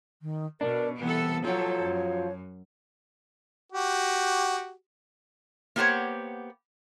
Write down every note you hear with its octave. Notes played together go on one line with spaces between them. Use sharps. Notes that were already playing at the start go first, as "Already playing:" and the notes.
D#3
B2 D4 A#4
C2 E3 B3 A4
F3 F#3 F#4 A4 C#5
F#2
F#4 G4
A#3 B3 G4 C5 C#5 F#5